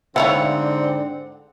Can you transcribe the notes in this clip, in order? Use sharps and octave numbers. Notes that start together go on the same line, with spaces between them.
G#2 D3 C4 E4 F4 C#5 D5 F#5